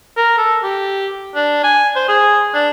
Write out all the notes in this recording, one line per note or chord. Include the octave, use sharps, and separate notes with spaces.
A#4
A4
G4
D4
G#5
C5
G#4
D4